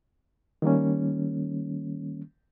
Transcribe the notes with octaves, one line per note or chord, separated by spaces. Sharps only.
D#3 G3 A#3 C#4